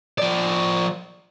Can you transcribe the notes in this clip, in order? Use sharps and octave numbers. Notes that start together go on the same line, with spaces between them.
F3 D5